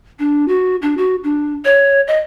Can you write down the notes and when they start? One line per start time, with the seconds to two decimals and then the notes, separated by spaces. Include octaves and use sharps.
0.19 D4
0.48 F#4
0.82 D4
0.97 F#4
1.24 D4
1.65 C#5
2.07 D#5